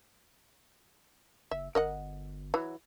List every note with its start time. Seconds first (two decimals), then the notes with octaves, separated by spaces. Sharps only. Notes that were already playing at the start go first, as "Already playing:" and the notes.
1.51 F#1 E5
1.75 G1 A#4 D#5 F#5
2.54 E3 F#3